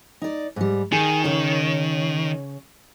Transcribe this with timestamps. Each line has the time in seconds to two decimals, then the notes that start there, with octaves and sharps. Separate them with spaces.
0.22 D#4 D5
0.56 G#2 G3
0.92 D#3 G#4
1.24 C#3 C#5